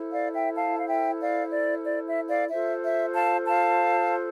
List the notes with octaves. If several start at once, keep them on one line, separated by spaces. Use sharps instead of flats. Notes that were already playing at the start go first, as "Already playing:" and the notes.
Already playing: E4 A4 C5
D5 F5
E5 G5
F5 A5
F5
E5 G5
D5 F5
D5
D5
E5
D5 F5
F4 A4 C5 E5
E5
F5 A5
F5 A5